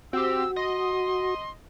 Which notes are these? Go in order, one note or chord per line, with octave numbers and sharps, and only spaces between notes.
C4 F#4 G4 E6
D#5 C6